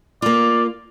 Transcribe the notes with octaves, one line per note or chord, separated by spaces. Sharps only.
A#3 F4 D5